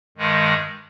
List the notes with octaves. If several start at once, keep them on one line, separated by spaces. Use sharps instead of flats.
G2 D#3 G#3